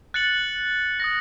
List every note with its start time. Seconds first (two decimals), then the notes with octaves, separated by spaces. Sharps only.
0.14 F#6 A6 C#7 F#7
1.00 D#6 F#6 A#6